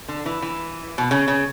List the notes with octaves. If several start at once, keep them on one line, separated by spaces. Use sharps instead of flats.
D3
E3
E3
B2
C#3
C#3